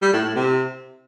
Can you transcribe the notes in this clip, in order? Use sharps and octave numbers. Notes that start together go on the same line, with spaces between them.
G3
A2
A2
C3